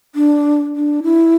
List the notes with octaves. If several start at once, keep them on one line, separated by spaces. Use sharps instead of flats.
D4
D4
E4